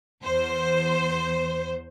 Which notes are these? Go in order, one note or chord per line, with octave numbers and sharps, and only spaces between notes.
E2 C5